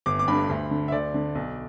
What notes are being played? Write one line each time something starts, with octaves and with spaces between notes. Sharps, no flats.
G1 D6
D6
G2 D3 B5
D2
D3
E5
D2 D5
D3
B1